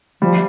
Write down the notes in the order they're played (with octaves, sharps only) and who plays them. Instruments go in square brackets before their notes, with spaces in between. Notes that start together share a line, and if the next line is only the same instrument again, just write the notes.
[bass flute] F3 [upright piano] G3